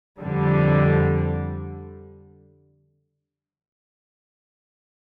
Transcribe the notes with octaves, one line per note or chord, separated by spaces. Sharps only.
F2 D3 G3